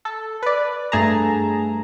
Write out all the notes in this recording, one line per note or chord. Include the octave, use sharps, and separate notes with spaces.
A4
B4 D5
G2 A3 G#4 A5 A#5